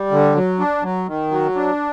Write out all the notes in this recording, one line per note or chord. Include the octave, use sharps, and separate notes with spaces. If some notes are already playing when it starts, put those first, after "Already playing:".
Already playing: G3
D3
F#3
D4
F#3
D#3
F#3
D4